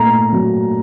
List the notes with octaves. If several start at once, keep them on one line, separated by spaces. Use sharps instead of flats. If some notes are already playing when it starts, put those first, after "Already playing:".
Already playing: A#2 A3 A#5
F#3